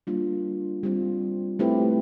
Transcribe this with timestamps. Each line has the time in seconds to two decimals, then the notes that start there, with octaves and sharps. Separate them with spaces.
0.07 G3 A#3 D4 F4
0.83 G3 C4 F4
1.59 A3 C4 E4 G4 B4